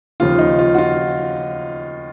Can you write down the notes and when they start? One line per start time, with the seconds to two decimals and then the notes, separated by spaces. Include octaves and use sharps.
0.20 D#2 C#3 F3 F4
0.39 D#4
0.59 F4
0.74 F#4
0.78 F4